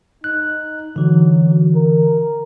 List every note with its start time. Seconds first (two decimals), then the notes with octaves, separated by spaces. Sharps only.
0.24 D#4 F#6
0.96 D3 E3 F#3
1.75 A#4